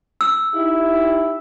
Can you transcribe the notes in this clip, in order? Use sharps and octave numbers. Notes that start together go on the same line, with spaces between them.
E6
D#4 E4 G4